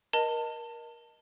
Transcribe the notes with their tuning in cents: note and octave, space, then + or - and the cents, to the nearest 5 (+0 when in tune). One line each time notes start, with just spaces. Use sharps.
A#4 +25 D#5 +0 A5 +25